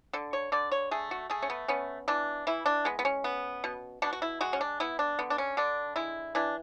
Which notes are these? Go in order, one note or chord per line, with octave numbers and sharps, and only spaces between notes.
D3 A4
C#5
D3 D5
C#5
A3 G#4
F#4
A3 G#4
C#4
B3
B3 C#4
E3 D4
E3 E4
D4
G#3 B3
B3
C#4
B3
B2
B2 D4
F#4
E4
G#3 F#4
C#4
D4
B3 E4
D4
D3 B3
D4
C#4
D3 D4
G#3 E4
E3 D4